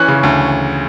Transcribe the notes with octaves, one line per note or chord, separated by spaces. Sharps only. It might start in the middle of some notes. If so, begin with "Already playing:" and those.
Already playing: E3 C#4 F#6
C#3
D2